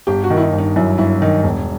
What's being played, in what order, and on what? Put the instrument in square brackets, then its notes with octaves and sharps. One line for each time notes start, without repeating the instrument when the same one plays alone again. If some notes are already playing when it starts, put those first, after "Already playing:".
[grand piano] G1 [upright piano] G4
[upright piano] F#4
[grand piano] D#3
[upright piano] E4
D#4
[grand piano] G1
[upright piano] D#4
[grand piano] F#2 [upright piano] E4
[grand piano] G1 [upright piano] E4
[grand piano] D#3 [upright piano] D#4
[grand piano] E1